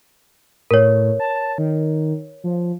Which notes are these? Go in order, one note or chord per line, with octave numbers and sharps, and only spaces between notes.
A2 A#4 C#5
A5
D#3
F3